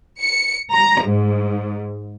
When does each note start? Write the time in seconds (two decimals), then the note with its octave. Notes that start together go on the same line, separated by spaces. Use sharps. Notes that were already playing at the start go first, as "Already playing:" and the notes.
0.21 C#7
0.72 A#5
1.05 G#2